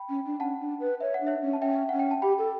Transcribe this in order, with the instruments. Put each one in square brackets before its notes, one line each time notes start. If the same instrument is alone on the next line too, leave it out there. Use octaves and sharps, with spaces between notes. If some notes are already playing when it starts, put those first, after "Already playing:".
Already playing: [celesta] G5 B5
[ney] C#4
D4
[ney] C#4 [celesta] F#5 A5
[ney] D4
B4
[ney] C#5 [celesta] E5
[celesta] F#5
[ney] D4
[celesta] C#5 E5
[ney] C#4
[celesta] A5
[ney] C#4 [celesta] E5 G5
[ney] C#4 [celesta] F#5
[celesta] G5
A5
[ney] G4 [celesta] G5 B5
[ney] A4